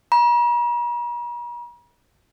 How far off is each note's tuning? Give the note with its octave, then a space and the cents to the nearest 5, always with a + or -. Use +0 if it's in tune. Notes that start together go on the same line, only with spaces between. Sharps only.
A#5 +45